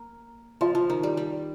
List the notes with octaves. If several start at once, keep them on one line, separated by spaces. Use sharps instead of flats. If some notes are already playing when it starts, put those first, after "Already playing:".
Already playing: A#3
F3 F4 D#5 C6
F3
D#3
G3
G3